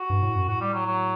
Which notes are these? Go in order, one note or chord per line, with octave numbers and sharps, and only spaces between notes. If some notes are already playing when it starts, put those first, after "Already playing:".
Already playing: F#4
G2
A2
F#2
A2 F#4
G3
F#3
F#3